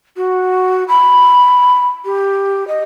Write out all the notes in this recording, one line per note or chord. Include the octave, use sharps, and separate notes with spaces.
F#4
B5
G4
D#5